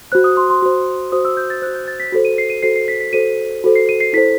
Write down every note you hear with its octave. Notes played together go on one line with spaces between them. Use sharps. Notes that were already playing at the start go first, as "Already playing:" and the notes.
F#4 C5 F#6
D#6
C6
C6
F#4 C5
F#4 C5 D#6
E6
G6
A6
F#4 C5 F#6
G6
A6
B6
F#4 A4 C5
D#7
C7
D#7
F#4 A4 C5 C7
C7
B6
B6
F#4 A4 C5 D#7
F#4 A4 C5
C7
D#7
C7
E4 A4 C5 B6